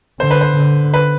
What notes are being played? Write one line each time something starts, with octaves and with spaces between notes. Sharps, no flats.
D3 C5
B4
C5
D3
B4